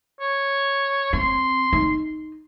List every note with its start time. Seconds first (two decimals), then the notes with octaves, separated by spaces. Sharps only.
0.20 C#5
1.13 C4 C6
1.73 D#4